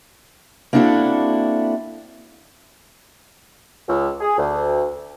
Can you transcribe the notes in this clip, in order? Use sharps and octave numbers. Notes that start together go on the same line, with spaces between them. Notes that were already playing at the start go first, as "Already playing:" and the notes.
A#3 C4 D4 E4 F#4 A4
C#2
G#4
D2